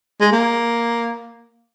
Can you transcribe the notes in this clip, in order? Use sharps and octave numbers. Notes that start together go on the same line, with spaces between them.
G#3
A#3